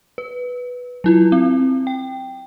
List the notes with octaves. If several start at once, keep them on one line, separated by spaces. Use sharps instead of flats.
B4
F#3 E4 F4
C4
G5